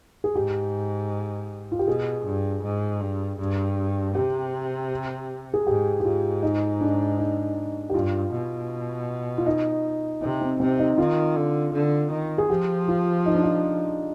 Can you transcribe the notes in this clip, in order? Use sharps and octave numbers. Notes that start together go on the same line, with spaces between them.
G#4
G#2 G4
F4
G4
B2 G#4
G2
G#2
G2
G2
C3 G4
G#4
G#2 G4
G4
G#2 F4
D#4
D4
D#4
G4
G2 F4
B2
F4
D#4
C3 D#4
C4
C3 C4
D#4
D#3 F4
D3
D3
D#3
G#4
F3 G4
F4
D#4
D4
D#4